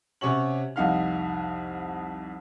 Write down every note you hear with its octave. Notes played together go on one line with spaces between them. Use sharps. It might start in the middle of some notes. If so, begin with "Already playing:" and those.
C3 C#4 F#4 C#5 F#7
C2 F2 D#4 F5 F#5 F6